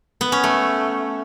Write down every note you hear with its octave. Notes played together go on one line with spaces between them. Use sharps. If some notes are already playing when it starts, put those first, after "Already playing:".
B3
C#4
A3